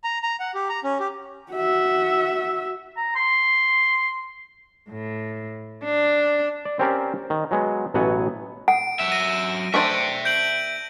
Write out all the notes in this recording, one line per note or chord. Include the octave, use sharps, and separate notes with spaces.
A#5
A#5
F#5
G4
A#5
C#4
G4
F#4 E5
A#5
C6
A2
D4
D5
C4 C#4 G4 A#4 C5 D5
D#3
F#3 G#3 B3
A1 B2 F#3 B3 F#5 G#5
F#5 D7
F#3 E5
A#6 D#7
A3 D4 C5 E5 G5
G6 D7 F#7